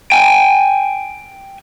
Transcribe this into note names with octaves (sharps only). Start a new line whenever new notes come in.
G5 G#5